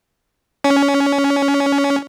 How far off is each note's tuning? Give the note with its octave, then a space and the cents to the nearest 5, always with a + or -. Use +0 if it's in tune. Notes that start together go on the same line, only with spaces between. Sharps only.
C#4 +20